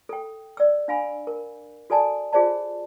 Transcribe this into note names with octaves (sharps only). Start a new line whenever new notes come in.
A4 G5
D5 E6
D4 F5 G#5 B5
A#4
F#4 A4 D5 G#5 A5
F4 G#4 C5 D5 A5